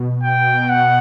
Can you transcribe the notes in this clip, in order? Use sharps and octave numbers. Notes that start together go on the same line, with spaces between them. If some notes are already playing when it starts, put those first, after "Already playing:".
Already playing: B2
G5
F#5